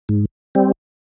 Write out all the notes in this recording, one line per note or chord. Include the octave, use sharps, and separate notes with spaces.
G#2
G3 C4